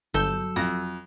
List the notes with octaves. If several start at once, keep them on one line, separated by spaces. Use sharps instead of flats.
G1 F#3 A4 G6
F2 A#6